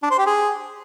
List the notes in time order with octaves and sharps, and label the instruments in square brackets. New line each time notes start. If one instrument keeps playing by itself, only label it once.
[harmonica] D4
C5
G4
G#4